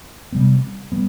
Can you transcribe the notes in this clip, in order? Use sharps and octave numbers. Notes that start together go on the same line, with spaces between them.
C3 G3 B3
G3 B3